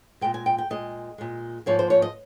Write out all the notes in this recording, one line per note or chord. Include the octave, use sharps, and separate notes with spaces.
A#2 G#3 G5
G#5
G5
G5
A#2 G#3 D#5
A#2 G#3
G#2 F3 A#3 C#5
C5
C#5
D#5